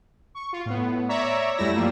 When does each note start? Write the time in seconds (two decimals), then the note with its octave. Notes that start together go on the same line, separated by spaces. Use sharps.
0.35 C#6
0.53 F4
0.66 A2 B3
1.09 C#5 D5 E5 A#5
1.57 F#2 G3 A3 E4 E6 A#6
1.75 G2 F3 G3 A#3